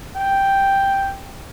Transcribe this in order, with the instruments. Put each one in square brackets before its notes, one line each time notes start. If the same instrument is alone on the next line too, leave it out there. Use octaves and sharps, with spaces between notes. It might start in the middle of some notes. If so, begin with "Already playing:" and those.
[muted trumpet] G5